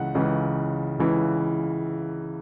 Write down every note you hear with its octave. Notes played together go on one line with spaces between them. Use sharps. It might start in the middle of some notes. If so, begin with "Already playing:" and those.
Already playing: C#2 C#3 E3 F#5
C#2 C#3 E3
C#2 C#3 E3